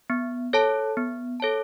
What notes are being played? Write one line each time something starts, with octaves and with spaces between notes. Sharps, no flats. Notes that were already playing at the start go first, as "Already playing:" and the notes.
B3
A4 C#5 A5
B3
A4 C#5 A5